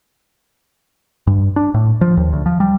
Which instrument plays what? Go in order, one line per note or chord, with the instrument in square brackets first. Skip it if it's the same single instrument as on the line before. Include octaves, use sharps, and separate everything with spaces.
[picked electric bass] G2
D4
A2
F3
D#2
D2
F3
G3